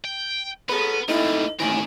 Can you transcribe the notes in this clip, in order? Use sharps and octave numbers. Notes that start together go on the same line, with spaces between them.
G5
B3 G#4 A4 B4
A3 A#3 D#4 E4 A4 D#5
A2 D#3 E3 A#4 D5 G#5